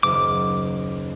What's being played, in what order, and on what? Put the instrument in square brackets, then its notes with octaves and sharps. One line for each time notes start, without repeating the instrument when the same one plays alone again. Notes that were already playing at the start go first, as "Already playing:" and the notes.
[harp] F#1 D#2 [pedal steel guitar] D6